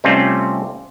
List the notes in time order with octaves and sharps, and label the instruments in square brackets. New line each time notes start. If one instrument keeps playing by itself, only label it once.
[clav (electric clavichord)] C3 G3 A3 C4 C#4 F4